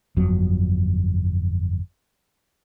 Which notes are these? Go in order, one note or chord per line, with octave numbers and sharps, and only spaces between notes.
G1 F2 F#3